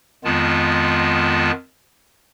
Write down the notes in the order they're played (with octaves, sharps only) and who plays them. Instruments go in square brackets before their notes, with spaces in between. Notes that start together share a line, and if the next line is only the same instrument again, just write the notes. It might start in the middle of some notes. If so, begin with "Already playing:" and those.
[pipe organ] F2 D#3 G#3 B3 F4 A5